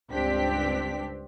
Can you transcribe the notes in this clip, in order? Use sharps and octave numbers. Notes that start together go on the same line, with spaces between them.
C#2 G2 C4 D4 G4 B6